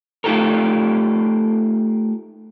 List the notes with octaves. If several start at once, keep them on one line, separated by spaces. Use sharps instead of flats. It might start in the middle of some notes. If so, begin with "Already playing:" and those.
A3 D#4 F4 G4 A4 A#4